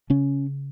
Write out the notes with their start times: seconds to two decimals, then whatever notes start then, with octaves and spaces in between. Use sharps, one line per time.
0.10 C#3 C#4